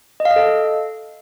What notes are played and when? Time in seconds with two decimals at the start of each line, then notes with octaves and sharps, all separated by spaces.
0.20 D#5
0.25 F5
0.31 D#5
0.36 A4